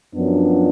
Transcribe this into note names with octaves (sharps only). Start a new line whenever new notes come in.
F#2 F3 B3 D4